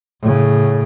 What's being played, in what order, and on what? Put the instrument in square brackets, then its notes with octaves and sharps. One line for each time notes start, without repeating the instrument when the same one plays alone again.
[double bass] A2 C#3